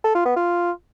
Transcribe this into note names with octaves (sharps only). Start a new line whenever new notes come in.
A4
F4
B3
F4